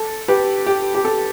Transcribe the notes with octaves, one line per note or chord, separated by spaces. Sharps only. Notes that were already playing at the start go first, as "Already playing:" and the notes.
Already playing: A4
G4 B4
G4
G4
A4